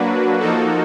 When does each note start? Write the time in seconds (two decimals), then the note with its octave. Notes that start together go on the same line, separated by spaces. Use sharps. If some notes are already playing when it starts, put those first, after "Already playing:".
Already playing: F#3 A#3 D4 F#4 B4
0.40 F3 A#3 D#4 F#4 A4